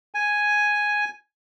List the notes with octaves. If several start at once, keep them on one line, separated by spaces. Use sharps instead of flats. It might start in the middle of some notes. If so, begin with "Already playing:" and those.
G#5